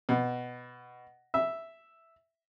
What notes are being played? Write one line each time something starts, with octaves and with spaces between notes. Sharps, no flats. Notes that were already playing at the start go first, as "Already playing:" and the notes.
B2
E5